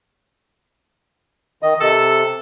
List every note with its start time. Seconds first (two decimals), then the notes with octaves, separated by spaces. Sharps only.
1.63 D#3 D#5
1.80 C3 A4